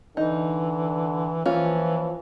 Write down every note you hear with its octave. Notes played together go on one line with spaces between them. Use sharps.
D3 E3 D#4
E3 F3 A#3 C#4 F4